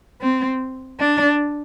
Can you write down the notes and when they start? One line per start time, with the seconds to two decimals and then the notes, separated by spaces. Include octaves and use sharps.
0.22 C4
0.99 D4